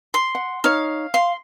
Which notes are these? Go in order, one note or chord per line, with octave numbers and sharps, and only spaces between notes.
C6
F#5
D#4 C#5 F5
F5 C6